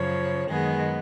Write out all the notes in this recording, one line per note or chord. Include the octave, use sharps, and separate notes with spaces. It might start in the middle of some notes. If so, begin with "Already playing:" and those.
Already playing: F#2 C#3 F3 C#5
F#2 D#3 G#3 B3 G#4